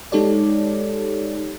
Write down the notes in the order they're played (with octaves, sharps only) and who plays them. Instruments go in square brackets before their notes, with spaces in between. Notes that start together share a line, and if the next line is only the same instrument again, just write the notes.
[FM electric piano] G#3 D#4 G4 A4 C#5 D5